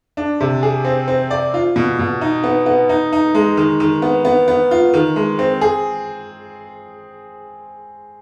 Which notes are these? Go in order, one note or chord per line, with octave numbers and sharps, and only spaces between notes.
D4
C3
G#4
C4
C4
D5
F4
B2
B2
D#4
B3
B3
D#4
D#4
G#3
D#3
D#3
B3
B3
B3
F4
D#3
G#3
C4
G#4